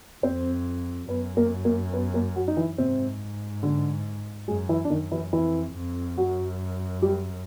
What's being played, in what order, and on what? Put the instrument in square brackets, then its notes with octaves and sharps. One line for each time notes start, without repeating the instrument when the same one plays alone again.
[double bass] F2 [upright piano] C4 C5
[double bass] F#2 [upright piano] B3 B4
[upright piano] A#3 A#4
A#3 A#4
B3 B4
A#3 A#4
F#3 F#4
D#4
E3 E4
[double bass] G#2 [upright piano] C3 C4
[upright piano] D3 D4
[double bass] F#2 [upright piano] G#3 G#4
[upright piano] E3 E4
D4
[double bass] F#2 [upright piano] D#3 D#4
[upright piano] E3 E4
[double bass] F2 [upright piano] E3 E4
[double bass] F2
[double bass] F#2 [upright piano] F#3 F#4
[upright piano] G3 G4